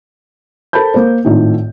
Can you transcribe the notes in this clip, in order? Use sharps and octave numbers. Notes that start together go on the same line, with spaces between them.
A4 A#4 C5 A5 B5 G6
A#3 A#4 C5
G#1 A2 D#4 F4